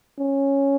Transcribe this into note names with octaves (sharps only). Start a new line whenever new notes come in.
C#4